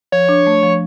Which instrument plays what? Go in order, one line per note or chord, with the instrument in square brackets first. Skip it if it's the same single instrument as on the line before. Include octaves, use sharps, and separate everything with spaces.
[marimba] F3 [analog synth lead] C#5
[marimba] D4
A3
F3